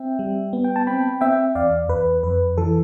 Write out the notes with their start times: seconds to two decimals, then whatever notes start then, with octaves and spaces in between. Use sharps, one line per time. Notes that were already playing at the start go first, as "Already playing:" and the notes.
Already playing: C4 E5 G5
0.19 G3
0.53 B3
0.64 G5
0.76 A5
0.87 C4 G5 B5
1.21 C4 E5 G5
1.55 E2 D5 F5
1.89 E2 B4
2.23 F2 B4
2.57 E3 A4